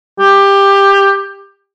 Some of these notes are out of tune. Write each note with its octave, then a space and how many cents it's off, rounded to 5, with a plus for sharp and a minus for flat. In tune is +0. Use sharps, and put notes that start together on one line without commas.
G4 +15